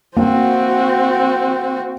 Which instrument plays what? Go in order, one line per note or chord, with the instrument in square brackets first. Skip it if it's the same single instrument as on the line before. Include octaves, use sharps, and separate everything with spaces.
[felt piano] A#3 [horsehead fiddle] C4 F#4